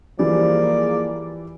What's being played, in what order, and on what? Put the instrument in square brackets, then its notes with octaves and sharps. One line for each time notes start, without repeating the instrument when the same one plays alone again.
[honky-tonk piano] E3 G3 [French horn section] F3 A#3 G#4 [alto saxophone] D5